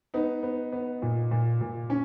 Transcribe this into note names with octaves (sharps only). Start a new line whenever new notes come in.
B3 D#4
B3
B3
A#2
A#2
A#2
C#4